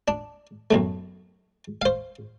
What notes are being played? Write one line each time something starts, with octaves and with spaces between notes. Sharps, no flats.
D4
B1 F#2 A3
C5 F5